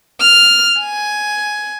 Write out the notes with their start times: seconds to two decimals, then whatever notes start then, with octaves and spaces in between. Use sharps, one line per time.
0.20 F6
0.79 G#5